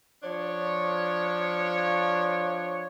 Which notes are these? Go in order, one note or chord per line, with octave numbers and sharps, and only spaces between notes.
F3 D4 C#5